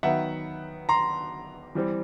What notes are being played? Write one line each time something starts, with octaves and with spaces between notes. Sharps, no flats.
D#3 F#3 B3 E5 F#5
A#5 C6
E3 G3 C4